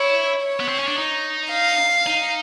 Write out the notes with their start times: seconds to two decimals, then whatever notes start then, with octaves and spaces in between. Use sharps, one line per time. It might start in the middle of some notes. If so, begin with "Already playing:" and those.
Already playing: E4 C#5
0.43 C#5
0.60 B3
0.68 C4
0.79 C#4
0.87 D4
0.97 D#4
1.52 F5
2.07 D#4